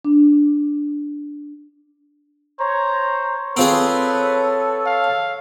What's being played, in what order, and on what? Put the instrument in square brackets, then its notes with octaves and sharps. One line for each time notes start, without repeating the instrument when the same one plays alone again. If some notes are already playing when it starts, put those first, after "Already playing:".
[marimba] D4
[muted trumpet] C5 [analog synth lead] C#5 [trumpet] A#5
[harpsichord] C4 F4 G#4 [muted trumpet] A4 [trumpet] B4
[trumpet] F5